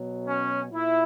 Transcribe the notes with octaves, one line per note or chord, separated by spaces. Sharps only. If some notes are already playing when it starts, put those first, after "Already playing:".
Already playing: B2 F#3
C#4
A#2 E4